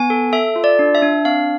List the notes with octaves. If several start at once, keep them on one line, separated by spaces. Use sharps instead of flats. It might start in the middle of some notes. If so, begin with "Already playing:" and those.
Already playing: B3 G#5
A4
A4 E5
F4
D5
D4
E5
D4
C4 F5